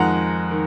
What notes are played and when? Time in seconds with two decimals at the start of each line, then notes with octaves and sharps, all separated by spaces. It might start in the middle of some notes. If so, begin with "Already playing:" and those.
Already playing: F2 D#3 G#3 F#5 A#5
0.51 D#3